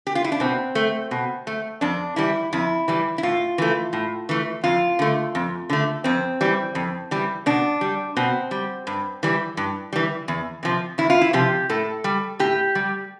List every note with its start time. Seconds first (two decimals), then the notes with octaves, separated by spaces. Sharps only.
0.07 G4
0.15 F4
0.24 E4
0.32 D4
0.40 B2 C4
0.75 A3
1.11 B2
1.47 A3
1.81 F2 D4
2.16 E3 G3 E4
2.53 F2 E4
2.88 E3 G3
3.18 E4
3.23 A2 F4
3.58 E3 A3
3.93 A2
4.29 E3 A3
4.64 F2 F4
4.99 D3 A3
5.35 F2
5.70 D3 A3
6.04 F2 C4
6.41 E3 G3
6.75 F2
7.11 E3 G3
7.46 B2 D4
7.81 G3
8.17 B2 C4
8.51 G3
8.87 G2
9.23 E3 G3
9.57 G2
9.93 E3 G3
10.28 E2
10.63 C3 F3
10.98 E2 E4
11.10 F4
11.21 E4
11.33 C3 F3 G4
11.69 A2 A4
12.04 G3
12.39 A2 G4
12.75 G3